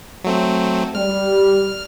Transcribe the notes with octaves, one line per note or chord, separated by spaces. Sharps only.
F#3 A3 C4
G3 F6